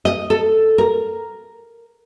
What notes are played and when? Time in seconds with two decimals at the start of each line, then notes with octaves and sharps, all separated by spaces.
0.05 D#5
0.30 A4
0.78 A#4